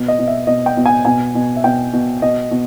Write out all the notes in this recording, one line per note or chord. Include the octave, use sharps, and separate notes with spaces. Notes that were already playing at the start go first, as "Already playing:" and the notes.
Already playing: B2
D#5
B2
E5
B2 D#5
G5
B2
G#5
B2 G#5
B2
E5
B2 G5
B2
B2 D#5
B2